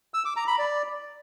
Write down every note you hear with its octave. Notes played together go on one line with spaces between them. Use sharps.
E6
D6
A#5
B5
D5